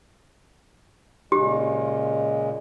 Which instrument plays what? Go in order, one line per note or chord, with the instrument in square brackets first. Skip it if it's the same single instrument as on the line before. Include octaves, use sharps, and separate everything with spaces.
[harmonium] A#2 C#3 G#3 [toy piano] G4